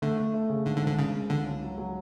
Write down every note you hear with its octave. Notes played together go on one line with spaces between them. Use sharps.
D3 A3
A3
A3
C#3
G#2 D3
D3
G#1
D3
G#1 C#3
G#3
C#2 D3
C#4
F#3
F#3